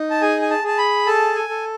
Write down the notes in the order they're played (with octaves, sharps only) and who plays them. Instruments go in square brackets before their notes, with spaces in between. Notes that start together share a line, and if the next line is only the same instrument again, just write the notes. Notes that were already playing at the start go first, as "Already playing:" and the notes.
Already playing: [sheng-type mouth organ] D#4
A5
G#4 G#5
G#5
A5
G#4 A5
B5
A4 A5
G#5
A4